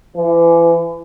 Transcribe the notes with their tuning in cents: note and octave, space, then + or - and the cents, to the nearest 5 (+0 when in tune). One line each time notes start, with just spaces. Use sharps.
E3 +35